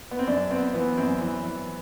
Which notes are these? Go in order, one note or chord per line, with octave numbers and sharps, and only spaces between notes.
B3
C4
F#2 D4
B3 C4
E3 B3
F#2 C4
E3
E3